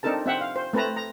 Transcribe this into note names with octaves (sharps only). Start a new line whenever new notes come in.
C4 D4 D#4 A4 A#4 A5
C4 E5 F#5 G5
F5
C5
A3 C4 B4 A5 A#5
A#5